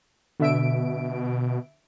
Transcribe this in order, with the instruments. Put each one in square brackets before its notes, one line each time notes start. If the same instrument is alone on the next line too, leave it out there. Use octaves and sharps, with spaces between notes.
[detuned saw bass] B2 [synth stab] D3 E5 D7